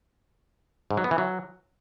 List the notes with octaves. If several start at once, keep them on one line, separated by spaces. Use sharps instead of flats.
G#2
F#3
B3
E3
F#3